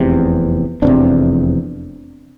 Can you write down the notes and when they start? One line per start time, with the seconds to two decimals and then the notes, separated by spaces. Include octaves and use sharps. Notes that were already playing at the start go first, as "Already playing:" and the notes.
Already playing: F1 E2 C3
0.82 F1 E2 C3 C4 D4